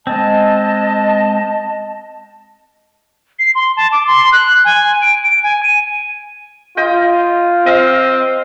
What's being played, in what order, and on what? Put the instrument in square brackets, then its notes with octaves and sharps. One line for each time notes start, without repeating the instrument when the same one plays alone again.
[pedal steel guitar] G#3 C4 [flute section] D#5 A5
[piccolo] C7
C6
A5
D6
C6
F#6
G#5
D7
D7
G#5
D#7
[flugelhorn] F4 [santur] D#5 G5
[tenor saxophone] C4 [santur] D#5 F5